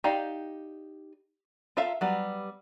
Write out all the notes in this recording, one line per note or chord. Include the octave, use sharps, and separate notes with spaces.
D#4 G4 D5 F5
F4 A4 E5 F5 A#5
F#3 G3 B3